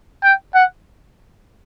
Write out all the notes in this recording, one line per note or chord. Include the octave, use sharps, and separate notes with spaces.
G5
F#5